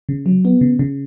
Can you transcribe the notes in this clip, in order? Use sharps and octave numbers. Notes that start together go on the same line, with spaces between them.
C#3
F#3
B3
C#3
C#3